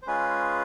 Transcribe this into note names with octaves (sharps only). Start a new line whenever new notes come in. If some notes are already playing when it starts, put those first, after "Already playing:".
C5
G#3 C#4 F4 G#4 B4